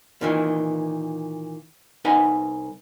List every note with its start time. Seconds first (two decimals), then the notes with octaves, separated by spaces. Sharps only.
0.21 A#2 D#3 E3
2.05 C2 D#4 B4 F#5 G#5